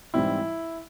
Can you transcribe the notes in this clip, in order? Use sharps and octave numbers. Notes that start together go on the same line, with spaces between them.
G#2 E3 G3 C4 E4